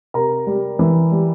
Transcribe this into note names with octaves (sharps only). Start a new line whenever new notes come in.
C3 A#4 A#5
G3
E3
G3